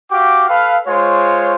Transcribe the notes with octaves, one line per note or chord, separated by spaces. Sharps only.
F#4 G4 F5 G5 D6
A4 B4 F5
G#3 F4 C5 C#5